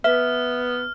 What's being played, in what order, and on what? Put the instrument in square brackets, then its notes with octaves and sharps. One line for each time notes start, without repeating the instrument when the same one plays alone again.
[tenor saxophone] B3 [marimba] B4 [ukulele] E5 [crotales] F6